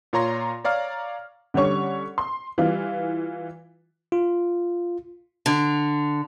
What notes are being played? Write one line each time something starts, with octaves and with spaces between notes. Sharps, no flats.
A#2 F4 C#5 A#5 C6 A#6
C#5 D5 F5 A#5 F6
D3 G3 C#4 C#5 C#6
C6
E3 G3 F4
F4
D3